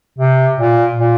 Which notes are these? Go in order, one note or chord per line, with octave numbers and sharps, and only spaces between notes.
C3
A#2
A#2